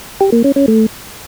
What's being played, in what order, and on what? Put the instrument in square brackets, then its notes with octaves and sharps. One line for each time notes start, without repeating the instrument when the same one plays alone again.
[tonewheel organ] G4
A#3
C#4
C#4
A3